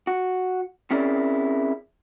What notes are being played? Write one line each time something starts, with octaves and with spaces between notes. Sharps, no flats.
F#4
C4 C#4 E4 G#4 A#4 D5